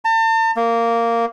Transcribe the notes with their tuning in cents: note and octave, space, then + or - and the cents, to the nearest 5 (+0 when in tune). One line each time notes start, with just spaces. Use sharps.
A5 +40
A#3 -10